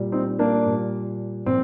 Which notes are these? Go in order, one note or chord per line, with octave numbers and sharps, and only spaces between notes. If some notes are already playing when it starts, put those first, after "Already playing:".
Already playing: A#2 G3
C4 D#4
A#3 D4
A#2 G3
A#2 F3 C4